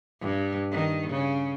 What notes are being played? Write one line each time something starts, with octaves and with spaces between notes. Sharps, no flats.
G2
D#3
C#3